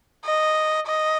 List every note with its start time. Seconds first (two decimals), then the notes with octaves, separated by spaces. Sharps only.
0.25 D#5
0.86 D#5